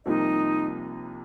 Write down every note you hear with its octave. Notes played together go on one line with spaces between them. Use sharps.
C2 C3 F3 A#3 D#4 D#5